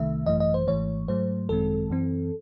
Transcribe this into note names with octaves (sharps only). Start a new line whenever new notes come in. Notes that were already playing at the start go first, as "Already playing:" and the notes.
Already playing: C2 C3 D#3 A3 E5
G#1 F#2 E3 A3 D#5
D#5
C5
G#1 G#2 E3 A3 C#5
G#2 F#3 A3 C5
G#1 F#2 D#3 G#3 C4 A4
F#2 E3 C4